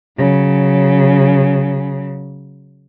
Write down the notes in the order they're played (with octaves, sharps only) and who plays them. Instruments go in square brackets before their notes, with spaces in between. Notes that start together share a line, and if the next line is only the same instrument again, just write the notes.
[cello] C#3 F#3